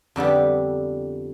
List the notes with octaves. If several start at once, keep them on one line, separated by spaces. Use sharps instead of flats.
F2 D3 G3 B3